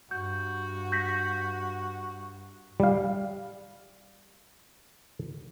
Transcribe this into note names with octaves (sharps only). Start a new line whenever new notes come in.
G2 F#4 G6
G6 A#6 B6
G3 F5